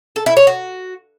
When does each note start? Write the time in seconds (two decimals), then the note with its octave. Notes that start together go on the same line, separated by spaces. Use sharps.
0.16 A4
0.26 E4
0.37 C#5
0.47 F#4